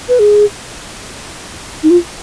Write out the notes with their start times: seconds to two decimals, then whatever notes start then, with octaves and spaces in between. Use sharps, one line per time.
0.09 B4
0.19 G#4
1.83 D#4
1.90 F4